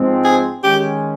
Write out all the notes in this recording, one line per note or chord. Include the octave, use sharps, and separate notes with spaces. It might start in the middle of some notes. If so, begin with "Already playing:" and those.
Already playing: G#2 F3 G#3 C4
G#4
D#3 G#3 C#4 G4